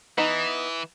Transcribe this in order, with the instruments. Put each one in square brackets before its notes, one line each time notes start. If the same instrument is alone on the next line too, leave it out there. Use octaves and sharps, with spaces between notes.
[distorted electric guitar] E3 [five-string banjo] B3 D#4